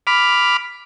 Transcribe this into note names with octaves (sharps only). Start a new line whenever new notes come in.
B5 D6 F6